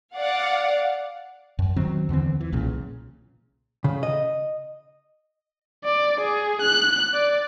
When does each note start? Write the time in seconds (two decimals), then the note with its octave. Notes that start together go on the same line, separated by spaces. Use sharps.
0.16 D5 F5 F#5
1.59 F#2
1.76 D#3 F#3 C4
2.09 E2 D3 E3 C4
2.41 E3
2.52 B1 A#2 C#3
3.84 C#3
4.03 D#5
5.85 D5
6.21 G#4
6.62 F#6
7.14 D5